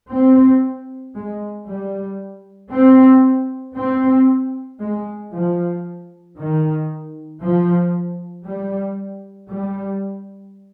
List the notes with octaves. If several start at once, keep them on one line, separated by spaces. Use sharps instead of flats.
C4
G#3
G3
C4
C4
G#3
F3
D#3
F3
G3
G3